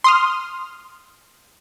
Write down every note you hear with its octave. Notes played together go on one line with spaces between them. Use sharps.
C6 D#6 F6